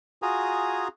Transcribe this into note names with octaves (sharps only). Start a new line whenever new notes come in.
F4 F#4 G#4 G#5 A#5 D#6